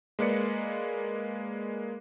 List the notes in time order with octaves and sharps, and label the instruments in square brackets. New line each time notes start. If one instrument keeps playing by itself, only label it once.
[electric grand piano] G#3 A#3 B4 D5 C#7